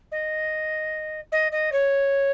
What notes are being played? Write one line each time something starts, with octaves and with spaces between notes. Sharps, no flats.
D#5
D#5
D#5
C#5